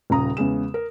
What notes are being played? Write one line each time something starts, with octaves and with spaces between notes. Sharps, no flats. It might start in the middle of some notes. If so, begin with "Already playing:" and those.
D#1 C#3 A#5 D#6
E2 C#3 G#3 E7
A#4